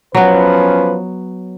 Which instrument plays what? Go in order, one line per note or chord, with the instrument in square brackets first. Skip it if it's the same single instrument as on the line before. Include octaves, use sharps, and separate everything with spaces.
[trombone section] F3 C#4 B4 [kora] F#3 B3